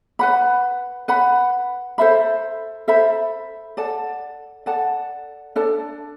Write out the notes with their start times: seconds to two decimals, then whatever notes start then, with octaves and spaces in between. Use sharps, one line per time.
0.19 B4 F#5 B5
1.08 B4 F#5 B5
1.98 A4 C5 E5 B5
2.88 A4 C5 E5 B5
3.77 A4 D5 F#5 A5
4.66 A4 D5 F#5 A5
5.56 D4 A4 D5 A5